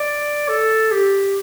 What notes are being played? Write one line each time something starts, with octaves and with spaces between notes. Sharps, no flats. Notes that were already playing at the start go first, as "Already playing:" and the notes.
Already playing: D5
A4
G4